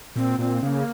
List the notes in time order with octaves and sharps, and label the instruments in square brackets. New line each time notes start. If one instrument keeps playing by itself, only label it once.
[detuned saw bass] A#2 [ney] C4
[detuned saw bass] A#2 [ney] C4
[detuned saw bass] C#3 [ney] A#3 C4